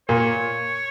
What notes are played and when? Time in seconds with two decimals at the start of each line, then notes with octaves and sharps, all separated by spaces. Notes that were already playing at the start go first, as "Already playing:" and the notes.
0.09 A#2 C#5